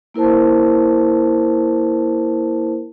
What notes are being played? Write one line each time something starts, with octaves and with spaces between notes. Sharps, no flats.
A#3 E4 A#4 C5 A5